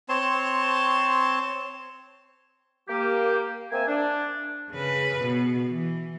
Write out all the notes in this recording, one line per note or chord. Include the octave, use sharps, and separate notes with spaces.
C4 C#5 A5 C6
A#3 G4
A#3 C4 E5 G#5
D4
C#3 B4
B2
E3